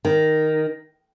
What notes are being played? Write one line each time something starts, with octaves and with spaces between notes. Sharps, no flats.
D#3